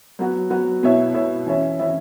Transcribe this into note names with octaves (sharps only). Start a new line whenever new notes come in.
F#3 B3 F#4
F#3 B3 F#4
B2 B3 E4 C#5 E5
B2 B3 E4 C#5 E5
E3 C#4 E4 C#5 E5
E3 C#4 E4 C#5 E5